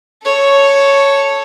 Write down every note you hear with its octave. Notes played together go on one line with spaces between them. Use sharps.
A4 C#5